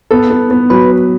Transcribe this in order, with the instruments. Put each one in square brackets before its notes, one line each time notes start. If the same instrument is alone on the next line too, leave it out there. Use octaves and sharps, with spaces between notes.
[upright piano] B3 [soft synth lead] A4
[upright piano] B3
B3
[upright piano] F#3 [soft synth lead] B4